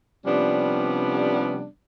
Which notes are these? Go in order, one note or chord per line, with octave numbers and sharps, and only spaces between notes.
C3 F3 G3 B3 C#4 D4